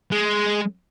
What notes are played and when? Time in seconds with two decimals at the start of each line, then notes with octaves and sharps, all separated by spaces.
0.12 G#3